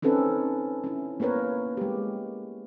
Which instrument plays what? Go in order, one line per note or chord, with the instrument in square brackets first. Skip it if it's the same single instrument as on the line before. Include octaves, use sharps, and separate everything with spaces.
[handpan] C4 C#4 D#4 A4 B4
C#4 E4
A#3 B3 A#4 B4 C#5
G#3 G4